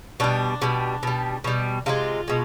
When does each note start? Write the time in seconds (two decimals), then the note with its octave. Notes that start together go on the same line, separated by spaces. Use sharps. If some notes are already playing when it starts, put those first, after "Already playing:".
0.20 B2 G3 D4
0.62 B2 G3
1.03 B2 G3
1.44 B2 G3
1.86 C3 F3 G#3 F4
2.28 B2 G#3